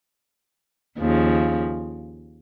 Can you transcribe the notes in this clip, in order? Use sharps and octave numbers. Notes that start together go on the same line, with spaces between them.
D#2 C#3 F3